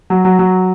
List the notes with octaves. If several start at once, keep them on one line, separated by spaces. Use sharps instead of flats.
F#3
F#3
F#3